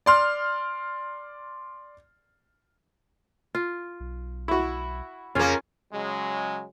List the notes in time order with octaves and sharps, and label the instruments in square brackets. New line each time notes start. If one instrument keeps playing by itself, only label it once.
[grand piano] D5 C6 F6
[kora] F4
[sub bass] B1
[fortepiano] E4 F#4
[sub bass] F2 [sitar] C#3 A#3 [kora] C#4 F4
[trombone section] C#3 F#3 G#3